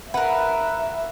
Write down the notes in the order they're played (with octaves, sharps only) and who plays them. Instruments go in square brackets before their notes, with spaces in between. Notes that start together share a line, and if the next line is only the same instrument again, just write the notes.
[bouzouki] A#4 B4 [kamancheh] E5 [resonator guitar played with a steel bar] F#5